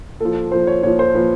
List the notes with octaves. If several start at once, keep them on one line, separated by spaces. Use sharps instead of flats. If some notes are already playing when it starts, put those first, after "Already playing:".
A#2 F3 A4
A#2 F3 C5
C#5
A#2 F3 C#5
C5
A#2 F3 B4